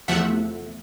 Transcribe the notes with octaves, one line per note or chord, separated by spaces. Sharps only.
E2 C3 F3 A3 E5 F#5